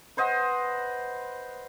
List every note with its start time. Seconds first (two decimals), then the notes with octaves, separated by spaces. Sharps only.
0.17 B4 C5 D#5 F#5